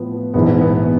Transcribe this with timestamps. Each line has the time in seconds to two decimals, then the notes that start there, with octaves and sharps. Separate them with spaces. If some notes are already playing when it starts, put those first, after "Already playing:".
Already playing: A2 F3 B3
0.34 A#1 G#2 E3 B3
0.61 B3